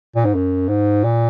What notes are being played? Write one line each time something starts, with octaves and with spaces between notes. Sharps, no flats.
A#2
G#2
F#2
G#2
A#2